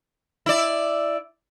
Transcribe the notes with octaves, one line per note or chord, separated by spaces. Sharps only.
E4 D5